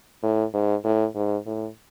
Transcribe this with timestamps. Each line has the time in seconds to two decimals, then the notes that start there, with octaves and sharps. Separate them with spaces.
0.23 A2
0.54 G#2
0.84 A2
1.15 G#2
1.46 A2